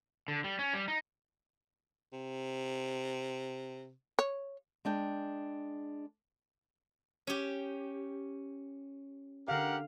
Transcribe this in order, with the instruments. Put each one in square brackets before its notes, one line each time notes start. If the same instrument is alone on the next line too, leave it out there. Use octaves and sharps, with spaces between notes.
[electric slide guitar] D3
G3
C#4
G3
D#4
[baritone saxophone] C3
[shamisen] C#5
[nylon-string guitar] G#3 D4 G5
[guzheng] C#4 G4
[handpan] D3 F5 [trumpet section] G4 A#4 F#5